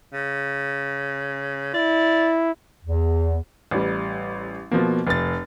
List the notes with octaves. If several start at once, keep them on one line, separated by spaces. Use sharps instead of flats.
C#3
E4 D5
E2
A1 G3
B2 F3 A#3
F1 A6